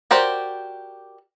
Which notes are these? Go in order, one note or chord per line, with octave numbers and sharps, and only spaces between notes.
F#4 G4 A#4 C5 D5